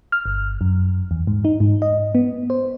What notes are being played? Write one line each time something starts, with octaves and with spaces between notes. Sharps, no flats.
F6
G1
F#2
E2
G#2
D#4
G#2
D#5
B3
C5